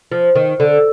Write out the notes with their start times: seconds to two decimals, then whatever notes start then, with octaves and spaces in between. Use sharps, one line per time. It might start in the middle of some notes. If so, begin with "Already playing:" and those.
0.12 F3
0.35 D#3
0.60 D3